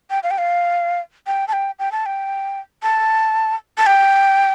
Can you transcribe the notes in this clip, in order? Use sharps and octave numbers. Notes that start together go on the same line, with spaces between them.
G5
F5
G5
F5
G5
A5
G5
G5
A5
G5
A5
A5
G5